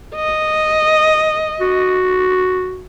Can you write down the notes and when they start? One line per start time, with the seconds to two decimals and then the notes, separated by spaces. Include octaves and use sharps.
0.16 D#5
1.60 F#4